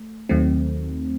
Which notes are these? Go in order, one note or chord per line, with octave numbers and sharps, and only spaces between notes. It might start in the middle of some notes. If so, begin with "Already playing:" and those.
Already playing: A3
D#2 D#3 F#3 A3 C4